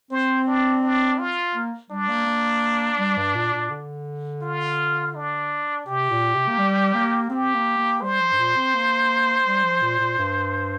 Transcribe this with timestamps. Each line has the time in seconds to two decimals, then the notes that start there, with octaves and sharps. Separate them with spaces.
0.11 C4 C5
0.47 D4
0.83 D4
1.18 F4
1.55 A#3
1.90 G3 D4
2.09 A#3
2.26 A#3
2.99 G3
3.17 G2
3.35 A#2
3.53 A#2
3.70 D3
4.42 F4
5.15 D4
5.86 C3 G4
6.10 A#2
6.35 C3
6.48 A#3
6.58 G3
6.94 A#3
7.30 C4 G4
7.54 A#3
7.78 A#3
8.02 G3 C5
8.20 F3
8.32 G2
8.38 A#2
8.56 C4
8.74 A#3
9.46 G3
9.63 F3
9.82 A#2
10.00 A#2
10.18 G2